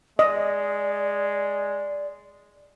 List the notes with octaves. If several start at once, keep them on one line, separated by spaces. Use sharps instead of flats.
G#3 D5 D#5